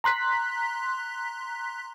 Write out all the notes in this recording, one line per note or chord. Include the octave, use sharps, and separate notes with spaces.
A#5 C6 F#6 B6